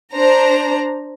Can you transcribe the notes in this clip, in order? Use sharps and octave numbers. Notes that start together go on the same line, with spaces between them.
D4 C5 A#5